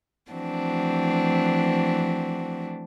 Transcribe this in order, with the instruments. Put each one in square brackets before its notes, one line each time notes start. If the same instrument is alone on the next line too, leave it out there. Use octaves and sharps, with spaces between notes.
[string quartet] E3 F3 A3 C4 D4 F#4